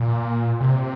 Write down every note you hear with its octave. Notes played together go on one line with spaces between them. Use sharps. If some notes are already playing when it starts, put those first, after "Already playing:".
Already playing: A#2
C3